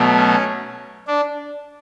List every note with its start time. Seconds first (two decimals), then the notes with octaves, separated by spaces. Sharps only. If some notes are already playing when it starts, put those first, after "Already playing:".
Already playing: B2 F#3 A3
0.17 C#4
1.07 D4